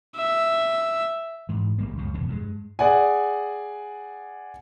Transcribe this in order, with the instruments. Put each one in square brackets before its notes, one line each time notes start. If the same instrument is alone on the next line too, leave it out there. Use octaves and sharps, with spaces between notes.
[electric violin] E5
[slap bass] G#2 E3
A1 G3 A#3
C#2 F#2 C#3
F1 E2 A2 C#3
G2 A#2 G#3
[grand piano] G#4 D5 F#5 G#5